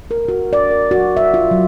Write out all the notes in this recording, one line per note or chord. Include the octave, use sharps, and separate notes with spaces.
A#4
F#4
D5
A#4
F#4
E5
F4
F#3